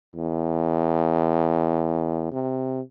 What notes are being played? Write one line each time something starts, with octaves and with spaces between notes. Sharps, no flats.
E2
C3